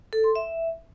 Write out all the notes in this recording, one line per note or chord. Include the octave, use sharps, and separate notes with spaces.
A4
C6
E5